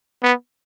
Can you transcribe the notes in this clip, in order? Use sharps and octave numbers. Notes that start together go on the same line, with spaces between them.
B3